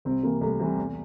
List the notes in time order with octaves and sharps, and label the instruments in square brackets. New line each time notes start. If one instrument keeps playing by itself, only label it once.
[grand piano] C2 [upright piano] C4
[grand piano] C3 E3 G3 [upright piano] A#3
[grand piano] C2 [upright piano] A3
[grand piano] C3 E3 G3
E2